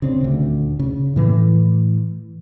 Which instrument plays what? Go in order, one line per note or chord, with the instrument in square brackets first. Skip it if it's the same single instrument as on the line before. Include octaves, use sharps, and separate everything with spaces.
[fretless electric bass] C#3 C4 D4
D#1 D2
C#3
A2 E3 A3